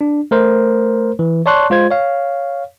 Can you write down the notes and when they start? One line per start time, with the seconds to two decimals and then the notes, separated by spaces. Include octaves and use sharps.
0.01 D4
0.31 A3 A#4 C5
1.19 E3
1.46 C#5 D5 A5 C6 C#6 F#6
1.70 G#3 F4 C5 G#6
1.91 C#5 F5